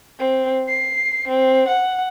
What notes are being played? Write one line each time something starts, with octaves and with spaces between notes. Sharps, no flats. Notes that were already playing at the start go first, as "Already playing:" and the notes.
C4
C7
C4
F#5